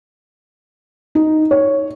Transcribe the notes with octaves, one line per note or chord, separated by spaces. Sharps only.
D#4
C#5